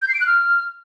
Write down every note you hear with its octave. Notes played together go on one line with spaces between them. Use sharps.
G6
C7
D7
F#6
F6